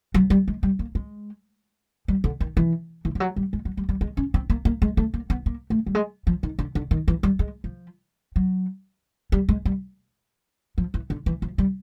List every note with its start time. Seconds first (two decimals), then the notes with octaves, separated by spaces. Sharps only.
0.14 F#3
0.30 G3
0.48 G#3
0.63 G3
0.79 A#3
0.95 G#3
2.08 G3
2.24 D3
2.40 D#3
2.57 E3
3.05 E3
3.15 F3
3.20 F#3
3.36 G3
3.53 G#3
3.65 F#3
3.77 G3
3.89 G3
4.01 G#3
4.17 C#4
4.34 C4
4.50 A#3
4.65 A#3
4.82 G#3
4.97 A3
5.14 A#3
5.30 B3
5.46 A#3
5.70 A3
5.86 G3
5.95 G#3
6.27 F3
6.43 D#3
6.59 D3
6.75 D3
6.91 D#3
7.08 E3
7.23 G3
7.39 G#3
7.64 F3
8.36 F#3
9.32 G3
9.49 G#3
9.65 G3
10.78 F3
10.94 E3
11.10 D3
11.26 E3
11.42 F3
11.58 G3